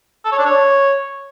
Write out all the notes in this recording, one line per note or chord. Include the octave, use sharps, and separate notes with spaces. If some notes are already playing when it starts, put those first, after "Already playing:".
A4
C#5
D4
C#5